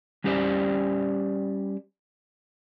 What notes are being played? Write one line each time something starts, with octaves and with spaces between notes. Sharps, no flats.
G3 C#4 G4 C5 D5